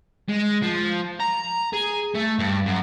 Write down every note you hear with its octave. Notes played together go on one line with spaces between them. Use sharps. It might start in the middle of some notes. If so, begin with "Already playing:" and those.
G#3
F3
A#5
G#4
A3
G2
F#2